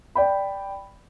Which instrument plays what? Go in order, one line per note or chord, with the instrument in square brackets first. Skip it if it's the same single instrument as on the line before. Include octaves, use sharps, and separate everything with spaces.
[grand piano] D5 G5 B5